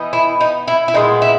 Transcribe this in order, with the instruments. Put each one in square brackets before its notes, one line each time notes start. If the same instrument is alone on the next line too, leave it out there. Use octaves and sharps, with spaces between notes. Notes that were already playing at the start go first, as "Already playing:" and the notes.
Already playing: [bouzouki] E3 B3 D#4
E4
D#4
E4
E4
A#2 G#3 B3 D#4
E4